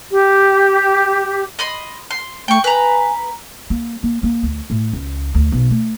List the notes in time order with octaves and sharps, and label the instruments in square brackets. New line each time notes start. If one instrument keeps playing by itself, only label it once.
[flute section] G4
[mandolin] D#5 B5 C6
C6
[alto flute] A3 [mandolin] G5 C#6
[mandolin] B4 A#5 [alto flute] G#5
[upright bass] A#3
A#3
A#3
D2
A2
C#2
D2
B1
A3